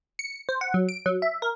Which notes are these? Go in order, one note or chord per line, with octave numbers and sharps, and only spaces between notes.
C#7
C5
F#5
F#3
D7
F#3
E5
A#4